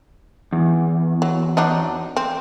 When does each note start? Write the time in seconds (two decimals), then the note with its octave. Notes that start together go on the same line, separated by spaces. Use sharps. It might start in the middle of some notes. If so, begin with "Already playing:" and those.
0.52 E2
1.22 F#3
1.57 F#3 D4 D#4
2.17 C4